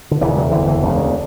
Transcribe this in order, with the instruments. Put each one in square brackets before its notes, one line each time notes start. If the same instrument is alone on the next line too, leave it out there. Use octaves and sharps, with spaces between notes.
[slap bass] D3
E1 E2 C#3 E3
F#3
F#1 E2 D3 E3
E3
E1 D2 C#3